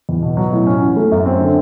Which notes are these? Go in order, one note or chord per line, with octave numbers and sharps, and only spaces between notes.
E2
B2
F#3
A2
C#4
E3
A3
F#2
C4
D3